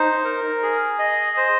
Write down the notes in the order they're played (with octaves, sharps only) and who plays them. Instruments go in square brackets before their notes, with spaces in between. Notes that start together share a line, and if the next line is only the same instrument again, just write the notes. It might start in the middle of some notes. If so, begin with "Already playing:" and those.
Already playing: [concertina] D#4 C5
A#4
G#4
D#5
C5